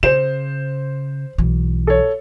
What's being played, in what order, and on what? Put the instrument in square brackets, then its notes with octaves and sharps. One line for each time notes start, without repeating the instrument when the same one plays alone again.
[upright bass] C#3 [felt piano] C5 E7
[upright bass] B1 E3
[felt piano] A4 C#5